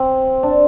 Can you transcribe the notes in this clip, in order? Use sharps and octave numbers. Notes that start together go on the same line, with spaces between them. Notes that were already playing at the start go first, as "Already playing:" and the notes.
Already playing: C4
D4